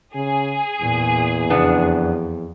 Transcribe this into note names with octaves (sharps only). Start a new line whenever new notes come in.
C#3 G#4
E2 A#2
F2 C#3 B3 D4